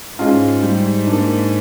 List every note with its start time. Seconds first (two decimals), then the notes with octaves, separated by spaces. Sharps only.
0.19 G#2 G#3 C#4 F4
0.63 G3
1.07 D4
1.12 A#3